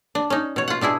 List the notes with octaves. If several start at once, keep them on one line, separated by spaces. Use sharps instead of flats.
D4
C#4 D#4
B2 C#5
F4 F#5
B2 D4 E4 G#4